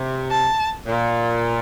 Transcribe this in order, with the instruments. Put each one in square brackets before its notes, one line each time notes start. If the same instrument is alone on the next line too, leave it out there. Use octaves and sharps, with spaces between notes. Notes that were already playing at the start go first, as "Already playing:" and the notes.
Already playing: [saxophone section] C3
[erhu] A5
[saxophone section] A#2